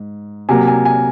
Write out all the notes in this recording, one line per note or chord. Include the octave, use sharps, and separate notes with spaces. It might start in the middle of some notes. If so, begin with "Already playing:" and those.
Already playing: G#2
C3 F#3 A#3 G#5
G#5
G#5